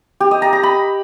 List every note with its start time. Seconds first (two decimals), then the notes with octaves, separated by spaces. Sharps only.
0.21 G4
0.31 D#5
0.42 A#5
0.53 A#5
0.63 B5